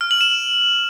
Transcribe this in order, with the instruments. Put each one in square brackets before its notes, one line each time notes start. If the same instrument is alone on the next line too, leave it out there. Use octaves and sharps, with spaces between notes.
[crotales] F6
F#7
E7